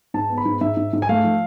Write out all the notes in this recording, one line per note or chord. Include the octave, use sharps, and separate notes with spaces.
G#2 A5
B3
B5
G#2
G#2 E5
G#2
G#2
G#5
A3 F5
F3